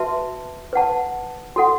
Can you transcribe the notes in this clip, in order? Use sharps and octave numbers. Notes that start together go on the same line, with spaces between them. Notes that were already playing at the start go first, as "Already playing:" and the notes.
Already playing: F#4 B4 E5 A5
B4 F#5 A5
F#4 A4 F#5